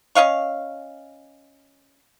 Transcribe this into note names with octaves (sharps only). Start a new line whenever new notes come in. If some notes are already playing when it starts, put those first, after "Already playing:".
C#4 D#5 F5 C#6